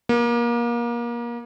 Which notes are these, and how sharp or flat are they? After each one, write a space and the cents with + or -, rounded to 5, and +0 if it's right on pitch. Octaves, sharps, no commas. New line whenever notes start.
A#3 +30